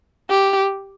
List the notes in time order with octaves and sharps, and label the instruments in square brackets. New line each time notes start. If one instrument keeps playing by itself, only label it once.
[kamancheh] G4